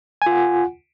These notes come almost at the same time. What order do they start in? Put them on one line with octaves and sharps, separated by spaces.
G#5 F4 F#5